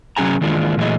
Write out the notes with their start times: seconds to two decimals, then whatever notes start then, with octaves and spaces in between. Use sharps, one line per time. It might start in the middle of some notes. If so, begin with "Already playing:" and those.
0.17 C3 F#3 C#4 G#4 G#5 A#5
0.41 D#3 E3 G#3 A#3 D4 F4
0.77 A#2 E3 F#3 A3 G#4 D#5